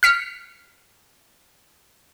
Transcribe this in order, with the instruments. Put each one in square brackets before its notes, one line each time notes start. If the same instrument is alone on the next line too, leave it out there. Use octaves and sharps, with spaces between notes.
[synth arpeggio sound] F6 B6 C#7